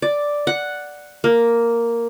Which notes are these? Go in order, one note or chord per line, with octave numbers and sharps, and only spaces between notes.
D5
F#5
A#3